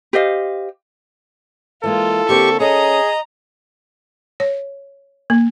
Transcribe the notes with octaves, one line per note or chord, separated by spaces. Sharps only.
G4 C5 D#5 F5
E3 G#3 A#3 F4 A4
D3 A#3 C4 G4 C#6
C#4 G#4 A4 B4 D#5 A#5
C#5
A#3